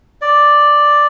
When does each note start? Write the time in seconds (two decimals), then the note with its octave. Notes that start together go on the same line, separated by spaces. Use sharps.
0.22 D5